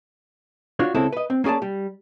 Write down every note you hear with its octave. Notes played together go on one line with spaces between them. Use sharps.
D4 F4 F#4 C#5
C#2 C#3 G#3 C4 E4 A4
B4 D#5
C4
A#3 C#4 G#4 D5 A5
G3